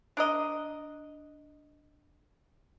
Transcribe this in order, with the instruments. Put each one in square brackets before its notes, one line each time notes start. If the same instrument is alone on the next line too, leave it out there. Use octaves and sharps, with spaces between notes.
[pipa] D4 A#4 D#5